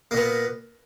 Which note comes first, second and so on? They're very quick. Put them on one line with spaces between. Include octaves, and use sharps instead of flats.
A#3 A#2 B3